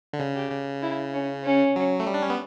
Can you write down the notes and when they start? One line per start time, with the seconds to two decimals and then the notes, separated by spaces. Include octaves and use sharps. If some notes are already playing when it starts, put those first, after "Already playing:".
0.13 D3
0.20 C#3
0.35 G4
0.51 C#3
0.82 E4
1.14 C#4
1.44 C#4
1.76 F#3
2.00 A3
2.07 G3
2.14 D4
2.22 C#4
2.30 B3